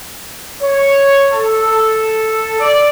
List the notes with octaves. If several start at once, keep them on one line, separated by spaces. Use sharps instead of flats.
C#5
A4
D5